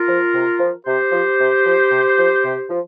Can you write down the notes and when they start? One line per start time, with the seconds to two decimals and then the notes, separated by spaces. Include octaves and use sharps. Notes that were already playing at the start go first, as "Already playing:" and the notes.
Already playing: F4 A#4
0.08 F3
0.34 C3
0.60 F3
0.86 C3 G4 C5
1.12 F3
1.40 C3
1.65 F3
1.91 C3
2.18 F3
2.44 C3
2.69 F3